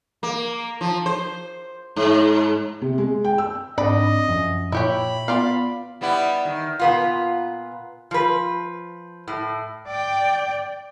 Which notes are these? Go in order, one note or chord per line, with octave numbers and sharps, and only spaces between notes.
A#3
F3
C5
G#2
C3
G#3
G5
E6
G#2 C4 D4 D5 D#5 B5
F#2 F3
A#2 E4 G4 C#5 B5
B3 F4 D5 F5
G3 B3 E4
D#3
A#2 B3 F4
F3 B4
A2
D5 G5